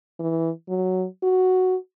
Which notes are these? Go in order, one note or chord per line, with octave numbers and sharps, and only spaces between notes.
E3
F#3
F#4